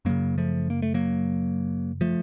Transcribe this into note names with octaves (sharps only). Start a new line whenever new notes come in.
F#2 C#3 F#3 A#3
F3 A3
A#3
A3
F#3 A#3
F3 A3